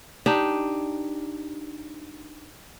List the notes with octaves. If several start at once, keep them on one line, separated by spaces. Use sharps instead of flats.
D4 D#4 G4